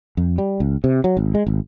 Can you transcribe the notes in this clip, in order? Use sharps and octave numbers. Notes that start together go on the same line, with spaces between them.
F2
G3
C#2
C3
F#3
G#1
G#3
G#1